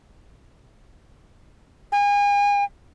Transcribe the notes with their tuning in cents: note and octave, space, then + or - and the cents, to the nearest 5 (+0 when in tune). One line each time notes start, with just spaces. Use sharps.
G#5 -35